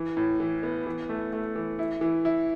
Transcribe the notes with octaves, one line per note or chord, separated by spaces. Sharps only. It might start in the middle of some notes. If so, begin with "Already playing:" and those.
Already playing: E3
A2
E3
B3
E3
A3
A3
E3
E4
E3
E4